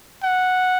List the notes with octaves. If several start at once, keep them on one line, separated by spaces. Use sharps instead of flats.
F#5